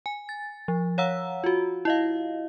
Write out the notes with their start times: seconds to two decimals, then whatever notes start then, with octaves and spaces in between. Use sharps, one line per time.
0.06 G#5
0.29 A6
0.68 F3
0.98 C#5 F5 F#5 A#5 E6
1.44 F4 F#4
1.85 E4 D#5 F5